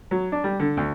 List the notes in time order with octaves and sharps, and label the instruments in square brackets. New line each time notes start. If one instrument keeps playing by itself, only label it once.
[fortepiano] F#3
D4
G3
D3
D2